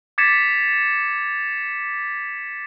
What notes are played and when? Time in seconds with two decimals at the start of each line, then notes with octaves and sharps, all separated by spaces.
0.18 D6 G#6 A6 B6 C#7 E7